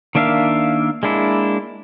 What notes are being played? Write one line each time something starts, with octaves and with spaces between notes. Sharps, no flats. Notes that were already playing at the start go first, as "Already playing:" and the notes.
D#3 A#3 D4 E5 F5
G#3 A#3 D4 E4